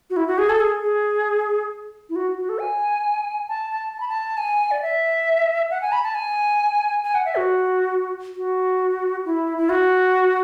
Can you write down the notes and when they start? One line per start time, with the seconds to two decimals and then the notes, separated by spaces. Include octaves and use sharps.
0.10 F#4
0.17 E4
0.27 F#4
0.38 G#4
0.49 A4
0.60 G#4
0.83 G#4
2.10 E4
2.16 F#4
2.38 F#4
2.49 A4
2.60 G#5
3.49 A5
3.71 A5
3.93 A5
4.00 B5
4.08 A5
4.37 G#5
4.71 D5
4.82 E5
5.70 F#5
5.82 G#5
5.92 B5
6.03 A5
6.15 G#5
7.04 G#5
7.15 F#5
7.26 E5
7.37 F#4
8.37 F#4
9.26 E4
9.58 E4
9.69 F#4